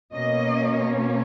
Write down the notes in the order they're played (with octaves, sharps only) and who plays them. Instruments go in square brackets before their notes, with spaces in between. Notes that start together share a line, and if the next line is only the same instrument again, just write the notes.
[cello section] B2 A#3 C#4 D#5